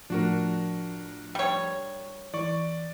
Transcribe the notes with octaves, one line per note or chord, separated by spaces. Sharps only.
A2 F3 D4 F#4 A#4
G3 C#5
E3 D5 C#6